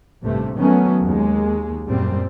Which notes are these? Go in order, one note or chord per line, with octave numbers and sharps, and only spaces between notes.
A1 G2 C3 A3
D#3 F#3 A3 B3 C#4
D#2 G#3
F#2 A#2 G3 C4